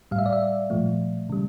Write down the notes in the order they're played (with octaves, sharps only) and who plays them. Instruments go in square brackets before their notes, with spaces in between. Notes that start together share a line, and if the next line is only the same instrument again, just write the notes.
[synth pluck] A2 G3 F5
E5
D5
E5
A#2 F3 A3
C#3 G3